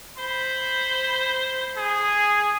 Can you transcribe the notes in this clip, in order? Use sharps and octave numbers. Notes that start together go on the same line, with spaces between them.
C5 B5
G#4